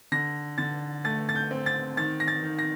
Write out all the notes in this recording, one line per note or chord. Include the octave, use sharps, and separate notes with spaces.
D3 A#6
D3 A6
A3 A6
A6
G6
C4
A6
D#3 A6
A#6
A6
D#3
A#6